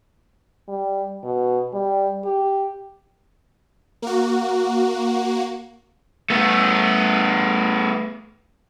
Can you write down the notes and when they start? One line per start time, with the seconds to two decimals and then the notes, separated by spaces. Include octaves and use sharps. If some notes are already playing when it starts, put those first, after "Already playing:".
0.69 G3
1.23 B2
1.73 G3
2.25 G4
4.02 A#3 F#4
6.30 A3 B3